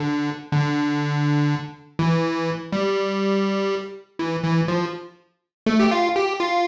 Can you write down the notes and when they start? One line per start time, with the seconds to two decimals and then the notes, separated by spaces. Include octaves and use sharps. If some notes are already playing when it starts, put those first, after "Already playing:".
Already playing: D3
0.52 D3
1.99 E3
2.72 G3
4.19 E3
4.44 E3
4.68 F3
5.66 A3
5.80 G4
5.91 F4
6.16 G4
6.40 F4